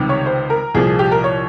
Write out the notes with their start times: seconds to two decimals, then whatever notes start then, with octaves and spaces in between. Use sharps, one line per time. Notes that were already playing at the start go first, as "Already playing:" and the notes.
Already playing: C#2 C3 D#3 G3
0.09 C#5
0.26 C5
0.50 A#4
0.75 C2 A#2 F3 G#4
0.87 G#4
0.99 G4
1.12 A#4
1.24 C#5